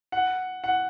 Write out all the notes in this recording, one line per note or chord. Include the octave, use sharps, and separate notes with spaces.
F#5
F#5